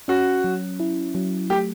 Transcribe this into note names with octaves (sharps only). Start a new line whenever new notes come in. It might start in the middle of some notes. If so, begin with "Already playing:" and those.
C#4 F#4
F#3
E4
F#3
A3 G4